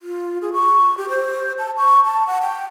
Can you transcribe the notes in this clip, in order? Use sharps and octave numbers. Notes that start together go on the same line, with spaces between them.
F4
G#4
C#6
G4
C5
A5
C#6
A5
F#5
G5